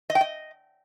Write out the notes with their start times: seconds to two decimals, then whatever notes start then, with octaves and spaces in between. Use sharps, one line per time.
0.10 D#5
0.15 G5
0.21 D#5